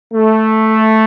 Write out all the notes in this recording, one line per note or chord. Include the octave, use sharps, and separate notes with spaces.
A3